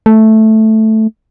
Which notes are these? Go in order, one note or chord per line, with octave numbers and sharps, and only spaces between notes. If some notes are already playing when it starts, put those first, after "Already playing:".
A3